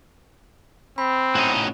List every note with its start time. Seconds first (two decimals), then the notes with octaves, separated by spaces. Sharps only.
0.98 C4 B5
1.35 A2 C#4 D#4 F#4 D#5